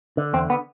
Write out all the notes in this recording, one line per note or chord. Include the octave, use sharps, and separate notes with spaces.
D3
E2 C4
B3